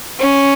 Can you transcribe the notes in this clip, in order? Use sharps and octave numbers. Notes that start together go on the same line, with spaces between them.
C#4